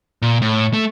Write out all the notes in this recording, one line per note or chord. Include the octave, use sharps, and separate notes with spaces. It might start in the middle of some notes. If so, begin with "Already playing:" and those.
A#2
A2
A3